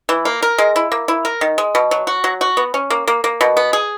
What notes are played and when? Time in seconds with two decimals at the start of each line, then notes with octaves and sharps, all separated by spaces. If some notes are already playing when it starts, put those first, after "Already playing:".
0.09 E3
0.25 A#3
0.43 A#4
0.58 G#3
0.76 E4
0.92 A#3
1.08 E4
1.25 A#4
1.41 D#3
1.58 G#3
1.75 B2
1.91 F#3
2.07 F#4
2.24 F#3
2.41 F#4
2.57 B3
2.74 C#4
2.90 A#3
3.07 A#3
3.24 A#3
3.41 B2
3.57 B3
3.73 G#4